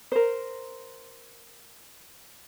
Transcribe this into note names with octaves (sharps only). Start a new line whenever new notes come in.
A#4 C5